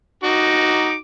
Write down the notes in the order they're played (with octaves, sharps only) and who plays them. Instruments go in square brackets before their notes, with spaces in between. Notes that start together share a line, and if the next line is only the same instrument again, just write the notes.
[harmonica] D#4 F#4 D6